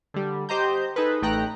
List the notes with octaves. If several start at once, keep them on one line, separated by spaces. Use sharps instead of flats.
D3 G3
G4 C5 D#5 A#5 G6
D#4 G#4 A4 B4
A1 A3 D#4 G5 A#5 F#6